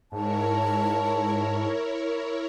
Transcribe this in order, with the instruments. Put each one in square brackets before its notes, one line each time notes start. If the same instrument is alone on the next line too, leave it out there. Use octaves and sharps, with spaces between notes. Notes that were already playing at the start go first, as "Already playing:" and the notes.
[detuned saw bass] G#2 [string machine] E4 A#4 C#5 [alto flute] A5